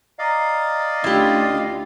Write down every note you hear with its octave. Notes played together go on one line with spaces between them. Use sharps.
D5 D#5 F5 A#5
D2 C#4 D4 E4 F4 G4